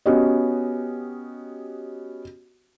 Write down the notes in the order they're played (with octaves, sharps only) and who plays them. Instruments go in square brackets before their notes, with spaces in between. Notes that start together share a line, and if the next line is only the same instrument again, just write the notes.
[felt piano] B3 C#4 F#4 G4 D#5